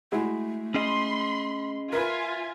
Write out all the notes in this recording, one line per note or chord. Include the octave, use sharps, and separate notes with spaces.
G#3 A3 E4 F#4
C#4 G#4 D#5 B5 C6
F4 A#4 B4 E5 G#5